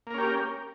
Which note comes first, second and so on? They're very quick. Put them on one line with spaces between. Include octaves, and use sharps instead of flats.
A#3 A#4 C#4 G4